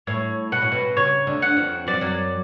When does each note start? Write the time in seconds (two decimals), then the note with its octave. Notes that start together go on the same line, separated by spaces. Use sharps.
0.07 A2 C#5
0.52 B2 F#5
0.62 A2
0.72 B2
0.97 C#3 C#5
1.27 D2 D3
1.42 F#5
1.57 F2 F3
1.87 F#3 D5
1.94 F3
2.01 F#2 F#3